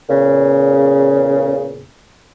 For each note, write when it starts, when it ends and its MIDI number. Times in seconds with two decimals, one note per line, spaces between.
0.10 1.88 40
0.10 1.88 46
0.10 1.88 49